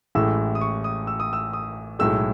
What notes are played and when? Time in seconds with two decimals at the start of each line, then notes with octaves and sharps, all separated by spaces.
0.15 A1 A2 G#3 E6
0.55 D#6
0.61 C#6
0.84 D#6
1.07 E6
1.20 D#6
1.33 E6
1.53 D#6
1.99 B1 A2 G#3 E6